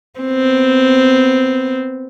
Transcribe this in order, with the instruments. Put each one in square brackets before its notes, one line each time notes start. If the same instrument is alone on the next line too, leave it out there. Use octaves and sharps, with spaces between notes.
[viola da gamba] B3 C4